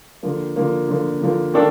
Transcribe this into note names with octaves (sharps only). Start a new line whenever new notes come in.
D3 F3 A#3
D3 F3 A#3
D3 F3 A#3
D3 F3 A#3
D#3 A#3 D4 A4